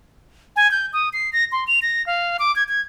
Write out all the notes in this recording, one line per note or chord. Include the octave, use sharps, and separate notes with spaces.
G#5
G6
D#6
C7
A#6
C6
F7
A#6
F5
D6
G#6
G#6